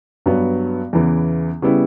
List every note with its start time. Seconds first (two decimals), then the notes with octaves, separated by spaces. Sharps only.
0.26 G2 F#3 B3
0.93 E2 C#3 E3 B3
1.62 C#3 G3 B3 E4